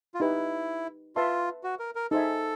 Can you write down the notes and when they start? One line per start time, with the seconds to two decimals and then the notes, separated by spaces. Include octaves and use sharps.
0.14 F4
0.20 D#4 E4 G4 B4
1.16 F4 B4 E5 A5 C6
1.64 F#4
1.79 A#4
1.95 A#4
2.11 D#4 G#4 A4 C5 E5 G#5